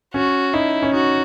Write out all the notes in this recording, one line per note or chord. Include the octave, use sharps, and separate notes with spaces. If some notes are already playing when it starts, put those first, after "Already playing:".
C#4 F#4
D#4 E4
C#4
D#4 F#4